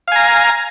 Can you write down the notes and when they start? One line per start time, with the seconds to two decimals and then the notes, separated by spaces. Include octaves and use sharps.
0.08 F5
0.12 G#5
0.16 A#5